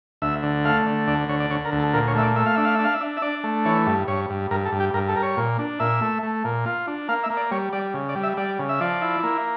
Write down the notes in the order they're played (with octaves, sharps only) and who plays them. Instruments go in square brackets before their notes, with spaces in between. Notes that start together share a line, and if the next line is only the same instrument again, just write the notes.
[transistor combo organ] D2 E5
D3
A3 F5
D3
D2 D5
D3 C#5
D5
D3 C#5
A#4
D2
A4
A#2 A#4
C#5
A3 E5
D5
A3 E5
F5
D4 E5
F5
D4 E5
F5
E5
D4
E5
D4 D5
A3
E3 C#5
G2
G2 C#5
G2
G2 A#4
A4
G2
G4
G2 A#4
A4
G3 A#4
C#5
A#2
D4
A#2 E5
A3
A3
A#2
F4
D4
A#3 F5
E5
A#3
D5
G3 C#5
G3 D5
C#3
D5
G3
E5
G3 D5
C#3
E5
F3 D5
E4
A#3